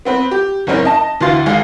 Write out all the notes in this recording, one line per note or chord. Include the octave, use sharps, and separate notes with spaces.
B3 C4 B4
G4
F#1 G#2 C4 C#4 D#4 A#4
D#5 A5
D2 E3 F#4 F5 C6 A6
G#1 G#3 F5 C7